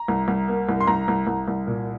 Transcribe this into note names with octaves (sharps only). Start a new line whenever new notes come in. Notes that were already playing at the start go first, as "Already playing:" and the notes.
Already playing: A#5
C2
C2
A#3
C2
C6
C2 A#5
C2
C2
C2
A#2